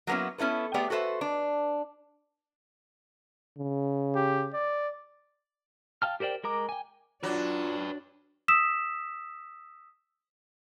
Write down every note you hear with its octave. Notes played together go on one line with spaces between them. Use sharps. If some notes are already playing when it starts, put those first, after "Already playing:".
F#3 A#3 B3 C#4 E4
B3 C#4 E4 A4 B4
A3 B3 G4 G#4 D5 F#5
F#4 A4 B4 C5 E5
D4
C#3
G4
D5
F5 G5 A5 F6
G4 A#4 C5 D5 G5
G#3 A#4 A#5 D6
G5 G#5
F#3 D4 F4 B4 D5
D#6 E6 B6 E7